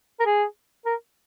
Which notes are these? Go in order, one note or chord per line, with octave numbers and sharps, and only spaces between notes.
A#4
G#4
A#4